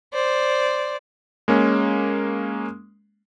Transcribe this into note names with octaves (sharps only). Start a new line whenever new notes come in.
C5 D5
G#3 A#3 C#4